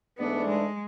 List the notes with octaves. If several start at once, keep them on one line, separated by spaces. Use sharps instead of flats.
G#2 E3 A3 B3 D4
G#3